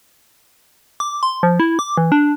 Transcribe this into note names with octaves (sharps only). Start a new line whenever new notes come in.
D6
C6
F3
E4
D6
E3
D4